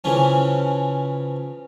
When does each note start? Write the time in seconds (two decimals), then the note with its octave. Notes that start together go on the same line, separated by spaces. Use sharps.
0.04 C#3 E3 F3 C#4